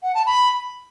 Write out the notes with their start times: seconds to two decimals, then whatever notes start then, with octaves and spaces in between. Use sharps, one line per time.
0.03 F#5
0.15 A5
0.26 B5